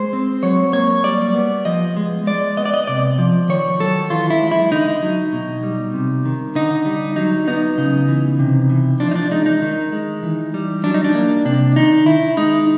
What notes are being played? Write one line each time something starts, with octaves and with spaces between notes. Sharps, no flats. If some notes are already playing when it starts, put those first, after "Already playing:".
Already playing: G#3 C5
C4
F#3 C#5
A#3 C#5
G3 D5
B3
F3 D#5
G#3
G#3 D5
B3 D#5
D5
D#5
C3 D5
F3
D#3 C#5
F#3 A4
E3 F4
E4
G#3
E4
D3 D#4
F#3
B2
G3
C3
D#3
D3 D#4
G3
F#3 D#4
B3 D#4
C#3
E3
C3
E3
F3 D4
D#4
D4
G#3 D#4
D#4
D#3
G#3
E3
G3
F#3 D4
D#4
D4
A#3
C3 D4
D#3 D#4
D#3 E4
G#3 D#4